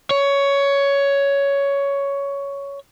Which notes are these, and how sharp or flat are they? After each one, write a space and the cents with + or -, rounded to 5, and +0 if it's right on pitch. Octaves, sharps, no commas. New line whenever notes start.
C#5 +10